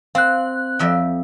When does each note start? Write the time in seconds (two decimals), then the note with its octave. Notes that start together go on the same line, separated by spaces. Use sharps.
0.15 C4 F5 F#6
0.79 F2 E5 G5